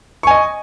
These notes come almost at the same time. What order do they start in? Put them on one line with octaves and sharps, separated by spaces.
C#6 G#5 D#5